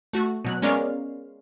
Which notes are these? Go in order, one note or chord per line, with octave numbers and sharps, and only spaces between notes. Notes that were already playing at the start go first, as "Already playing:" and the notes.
A3 F#4
B2 F#3 F#6
G#3 B3 C#4 A#4 D5 F5